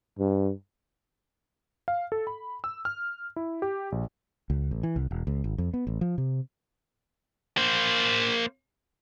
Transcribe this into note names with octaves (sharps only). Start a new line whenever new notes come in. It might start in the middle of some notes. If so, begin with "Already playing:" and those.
G2
F5
A4
B5
E6
F6
E4
G4
A#1
C#2
A1
E3
C2
E1
C#2
G#1
F2
B3
A1
F3
C3
A#3 C5